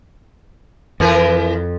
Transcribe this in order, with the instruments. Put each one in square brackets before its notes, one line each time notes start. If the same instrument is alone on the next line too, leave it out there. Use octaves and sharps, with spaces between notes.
[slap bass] F2 [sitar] E3 A#4 B4